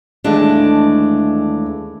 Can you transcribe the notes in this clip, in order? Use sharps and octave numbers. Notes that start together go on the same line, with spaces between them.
D#2 E3 G#3 A3 D4